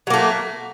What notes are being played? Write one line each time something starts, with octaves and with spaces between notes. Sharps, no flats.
F#3 A3 A#3